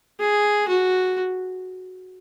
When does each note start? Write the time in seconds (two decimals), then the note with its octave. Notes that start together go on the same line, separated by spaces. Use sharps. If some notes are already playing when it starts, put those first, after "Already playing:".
0.20 G#4
0.68 F#4